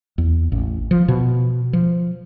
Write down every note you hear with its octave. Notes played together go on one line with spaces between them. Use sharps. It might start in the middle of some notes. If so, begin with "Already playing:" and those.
E2
A1
F3
B2
F3